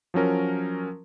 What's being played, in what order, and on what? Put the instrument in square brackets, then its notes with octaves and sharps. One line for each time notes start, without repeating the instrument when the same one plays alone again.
[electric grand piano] F3 F#3 C#4 A#4